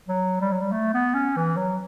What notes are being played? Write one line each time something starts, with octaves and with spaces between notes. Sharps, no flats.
F#3
G3
F#3
G3
A3
B3
C#4
E3
F#3